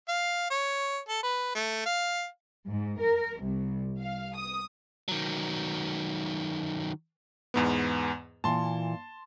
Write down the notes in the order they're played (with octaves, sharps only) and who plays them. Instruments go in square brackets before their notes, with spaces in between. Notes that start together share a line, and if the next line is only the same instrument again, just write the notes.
[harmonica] F5
C#5
A4
B4
A3
F5
[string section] G#2
A#4
C2
F5
D#6
[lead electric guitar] D#3 F#3
[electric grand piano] E2 G#2 B3
[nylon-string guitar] A#2 E3 [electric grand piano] A5 C6